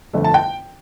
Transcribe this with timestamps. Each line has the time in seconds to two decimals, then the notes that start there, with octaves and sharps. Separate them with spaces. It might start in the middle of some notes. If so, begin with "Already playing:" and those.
0.13 G1 F2 D3 A3 D4
0.24 A5
0.34 G5